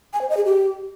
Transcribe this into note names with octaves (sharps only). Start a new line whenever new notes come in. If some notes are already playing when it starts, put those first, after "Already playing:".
G#5
C5
D#5
G#4
G4